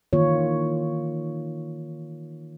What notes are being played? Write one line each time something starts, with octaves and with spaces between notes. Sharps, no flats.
D#3 E3 A#3 F4 C#5